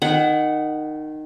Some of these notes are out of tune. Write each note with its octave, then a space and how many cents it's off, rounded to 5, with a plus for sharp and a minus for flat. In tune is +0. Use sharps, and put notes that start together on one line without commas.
D#3 -15 F#5 +0